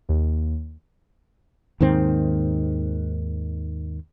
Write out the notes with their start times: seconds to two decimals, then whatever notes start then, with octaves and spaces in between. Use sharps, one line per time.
0.09 D#2
1.80 D#2 G#2 D#3 C4